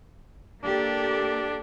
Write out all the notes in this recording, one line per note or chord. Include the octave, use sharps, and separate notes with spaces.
A#3 D4 G4 A4